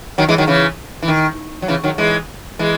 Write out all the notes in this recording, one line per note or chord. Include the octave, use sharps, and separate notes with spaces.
D#3 F#3
E3 G#3
D#3 F#3
C#3 E3
E3
D#3
F#3
C#3 E3
D#3 F#3
E3 G#3
E3 G#3